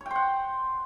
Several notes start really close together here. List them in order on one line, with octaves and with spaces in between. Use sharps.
C#5 G5 C5 F#5